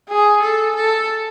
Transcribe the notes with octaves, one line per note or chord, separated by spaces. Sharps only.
G#4
A4
A4